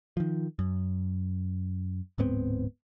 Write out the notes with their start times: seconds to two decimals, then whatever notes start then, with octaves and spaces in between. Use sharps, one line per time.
0.17 D#3 F3
0.59 F#2
2.18 D1 G#2 B3 C4